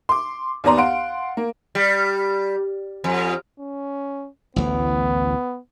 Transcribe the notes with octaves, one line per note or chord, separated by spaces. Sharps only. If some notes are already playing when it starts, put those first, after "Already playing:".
C6 D6
D#2 B3 D5 A#5 C6
F5 F#5 C6 D7
A#3
G3
F2
C#4
A1 D2 E3 B3